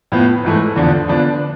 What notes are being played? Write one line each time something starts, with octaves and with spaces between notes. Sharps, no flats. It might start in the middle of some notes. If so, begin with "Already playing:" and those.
A2 F3 B3
G#2 E3 A3
E2 D3 F3
D3 F3 B3 D4